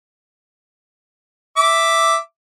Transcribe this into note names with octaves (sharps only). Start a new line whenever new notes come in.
E5 D6